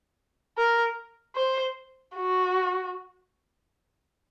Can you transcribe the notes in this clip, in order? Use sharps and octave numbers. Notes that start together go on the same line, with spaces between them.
A#4
C5
F#4